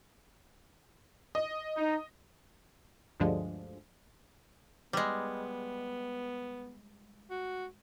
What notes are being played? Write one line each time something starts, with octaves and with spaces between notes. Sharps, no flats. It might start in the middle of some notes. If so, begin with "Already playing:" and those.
D#5
D#4
D2 G2 D3 F3 G#3
G3 G#3 B3
F#4